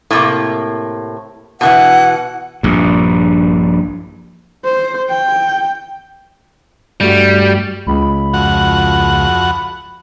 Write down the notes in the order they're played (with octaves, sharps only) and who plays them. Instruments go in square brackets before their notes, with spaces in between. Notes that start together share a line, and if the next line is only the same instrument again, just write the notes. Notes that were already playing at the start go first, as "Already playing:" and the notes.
[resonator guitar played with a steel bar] A2 C3 A#3
[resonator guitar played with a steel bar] B2 D#3 E3 [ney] F#5
[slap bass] A#1 G2
[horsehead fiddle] C5
G5
[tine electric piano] G2 A3 F#4 [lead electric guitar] G3
[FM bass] C#2 [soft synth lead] B5
[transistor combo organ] F2 F#4 F#5